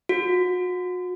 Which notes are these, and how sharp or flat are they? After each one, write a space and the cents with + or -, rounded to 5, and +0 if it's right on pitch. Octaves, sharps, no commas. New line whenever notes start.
F#4 -35